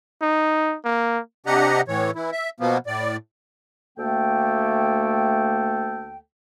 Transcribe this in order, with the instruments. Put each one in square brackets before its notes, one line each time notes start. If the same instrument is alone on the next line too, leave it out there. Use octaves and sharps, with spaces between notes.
[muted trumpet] D#4
A#3
[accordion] C3 D4 G4 D#5 F#5 A#5
A2 E3 C#5
E3 E4
E5
B2 F3 A#3 B3
A2 D5
[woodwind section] D2 A3 A#3 A4 G5